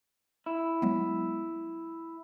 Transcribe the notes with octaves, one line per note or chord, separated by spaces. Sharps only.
E4
F#3 G#3 B3